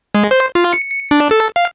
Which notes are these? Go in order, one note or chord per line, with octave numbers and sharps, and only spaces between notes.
G#3
C5
F4
C#7
D4
A4
F5